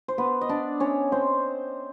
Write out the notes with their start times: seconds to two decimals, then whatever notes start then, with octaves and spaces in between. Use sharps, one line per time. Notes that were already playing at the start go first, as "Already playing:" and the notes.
0.08 C5
0.18 B3 B4
0.41 D#5
0.49 D4 D5
0.80 C#4 C#5
1.12 C4 C5